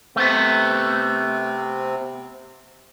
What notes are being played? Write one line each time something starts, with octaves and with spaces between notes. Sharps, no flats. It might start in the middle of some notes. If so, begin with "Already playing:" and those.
C3 A3 B3 C4